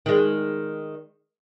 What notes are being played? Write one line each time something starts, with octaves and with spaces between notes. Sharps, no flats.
D#3 G#3